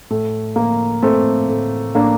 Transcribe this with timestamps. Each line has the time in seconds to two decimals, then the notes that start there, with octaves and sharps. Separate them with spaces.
0.10 A2 A3
0.56 A2 A#3
1.02 A2 A3 C4
1.48 A2
1.95 A2 A#3 D4